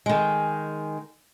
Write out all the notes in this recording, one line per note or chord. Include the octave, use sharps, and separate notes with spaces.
D#3 G#3